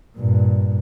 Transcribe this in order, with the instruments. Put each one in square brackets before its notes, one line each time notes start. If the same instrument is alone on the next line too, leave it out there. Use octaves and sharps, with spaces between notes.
[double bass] G2 A#2